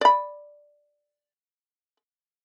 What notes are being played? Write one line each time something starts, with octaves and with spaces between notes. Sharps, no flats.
D5 B5